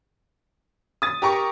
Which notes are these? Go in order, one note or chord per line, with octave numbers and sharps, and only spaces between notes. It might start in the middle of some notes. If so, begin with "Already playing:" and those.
D#6 A6
G4 A#4 C#6